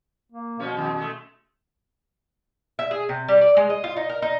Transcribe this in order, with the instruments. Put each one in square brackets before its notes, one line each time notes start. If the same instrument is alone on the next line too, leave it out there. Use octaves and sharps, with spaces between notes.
[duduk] A#3
[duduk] B2 [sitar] F3 G#3 C#4
[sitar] F2 D#3 G#3
G#3 A3
[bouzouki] E5
G#4
C3
G3
D5
G#3
D#5
F4
D#4
A#4
D#4